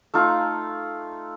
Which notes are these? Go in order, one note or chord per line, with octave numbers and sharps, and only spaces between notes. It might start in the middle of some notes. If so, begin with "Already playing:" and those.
A3 D#4 F4